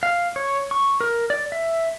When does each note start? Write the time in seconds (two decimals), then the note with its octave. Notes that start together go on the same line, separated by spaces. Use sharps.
0.03 F5
0.36 C#5
0.71 C#6
1.01 A#4
1.30 D5
1.52 E5